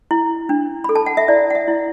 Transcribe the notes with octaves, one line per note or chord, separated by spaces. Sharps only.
E4
D4
A4 B5
A5
F#5
E5
E4 D5
F#5
E5
E4